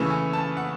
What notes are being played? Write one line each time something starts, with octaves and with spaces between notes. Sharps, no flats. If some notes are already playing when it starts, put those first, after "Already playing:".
Already playing: C#3 E3 A3 C#4 E4
G#5
A5
F#5